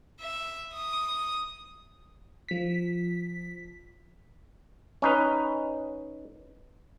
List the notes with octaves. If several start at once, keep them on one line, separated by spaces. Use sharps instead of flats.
E5
D#6
F3 B6
C#4 D#4 B4